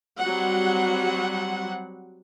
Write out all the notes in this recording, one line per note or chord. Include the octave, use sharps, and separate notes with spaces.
F#3 G3 C4 F#4 F#5